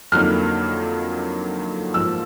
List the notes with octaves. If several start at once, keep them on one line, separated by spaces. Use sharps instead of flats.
F2 D3 F#3 A#3 D#4 F6
G#2 F3 A#3 E6